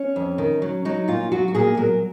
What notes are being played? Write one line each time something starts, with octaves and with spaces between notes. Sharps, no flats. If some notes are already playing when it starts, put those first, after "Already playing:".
Already playing: C#4
F2
D#3
F#3
F#3 D#4
A#2 F4
F#3 F#4
F#4
A#2 G#4
F#3 A#4